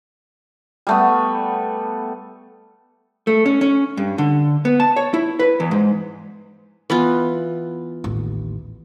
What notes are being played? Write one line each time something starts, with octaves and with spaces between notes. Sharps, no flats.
G3 A3 B3
A3
C#4
C#4
G2
D3
B3
A5
C#5
E4
B4
E2
G#2
E3 B3 F4
A1 D#2